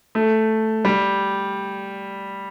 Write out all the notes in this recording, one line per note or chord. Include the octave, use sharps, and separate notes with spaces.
A3
G3